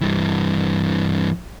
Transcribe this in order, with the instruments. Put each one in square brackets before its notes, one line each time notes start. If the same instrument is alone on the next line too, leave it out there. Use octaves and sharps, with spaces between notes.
[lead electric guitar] G2 E3